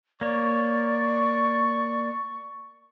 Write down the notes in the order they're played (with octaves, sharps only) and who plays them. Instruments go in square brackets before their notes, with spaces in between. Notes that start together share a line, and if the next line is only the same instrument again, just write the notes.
[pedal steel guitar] A#3 C#5 [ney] D5 [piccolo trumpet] C#6